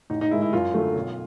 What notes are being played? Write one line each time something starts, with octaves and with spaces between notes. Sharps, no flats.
A1 D#4
D#4
G#2 D#3 G#3 E4
E4
F#2 F4
D3 F#3 A3
B1